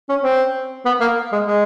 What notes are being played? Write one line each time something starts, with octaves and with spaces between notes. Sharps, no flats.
C#4
C4
B3
A#3
G#3
G#3